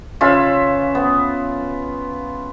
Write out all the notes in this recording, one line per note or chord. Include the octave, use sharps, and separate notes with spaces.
C#3 F4 B4 E5
B3